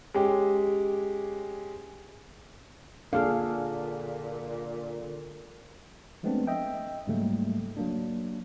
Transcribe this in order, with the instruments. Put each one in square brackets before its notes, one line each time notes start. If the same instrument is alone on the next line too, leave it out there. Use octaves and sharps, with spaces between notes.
[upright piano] G#3 C#4 G4
[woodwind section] A#2 [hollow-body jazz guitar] D3 A#3 A4 [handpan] G#4 F5
[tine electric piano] F3 G#3 A3 B3 C4 D4
D#5 E5 G5
G#2 C#3 F#3 G3 A3 A#3
F#3 A#3 D4